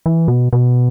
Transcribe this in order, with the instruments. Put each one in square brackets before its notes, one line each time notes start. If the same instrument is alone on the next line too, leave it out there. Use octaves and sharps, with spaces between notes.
[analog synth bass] E3
B2
B2